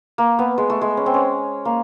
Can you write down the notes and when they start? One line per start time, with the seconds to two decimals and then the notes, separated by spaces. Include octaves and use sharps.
0.18 A#3
0.39 B3
0.58 G#3
0.70 A3
0.81 G#3
0.97 C#4
1.06 C4
1.14 C#4
1.65 A#3